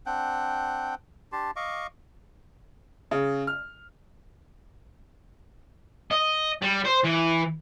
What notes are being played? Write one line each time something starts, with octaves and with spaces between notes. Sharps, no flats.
C4 D4 F#5 G5
D4 G4 A5 C6
D#5 F5 C#6 D6
C#3
F6
D#5
G3
C5
E3